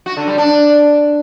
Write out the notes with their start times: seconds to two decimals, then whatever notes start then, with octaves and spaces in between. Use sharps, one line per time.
0.06 F#4
0.17 D3
0.27 G3
0.38 D4